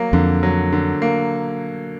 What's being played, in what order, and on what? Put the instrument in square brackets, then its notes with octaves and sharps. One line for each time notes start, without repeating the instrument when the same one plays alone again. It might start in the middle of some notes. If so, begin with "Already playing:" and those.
Already playing: [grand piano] F#3 A#3
[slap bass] F2 [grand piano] D3
[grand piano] F#3
D3
A#3